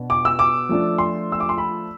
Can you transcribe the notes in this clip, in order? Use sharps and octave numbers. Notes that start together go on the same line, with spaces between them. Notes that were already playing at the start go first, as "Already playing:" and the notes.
Already playing: B2 B3 D4
D6
E6
D6
F3 A3 D4
C6
E6
D6
C6
B5